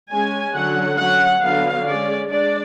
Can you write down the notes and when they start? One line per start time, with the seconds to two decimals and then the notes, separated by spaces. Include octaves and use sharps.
0.10 G#3 C#4 G#5
0.54 D3 F#3 C#4 F#5
0.98 F#3 C#4 F#5
1.42 D3 F#3 B3 F5
1.85 G#3 C#4 D5
2.30 G#3 D4 D5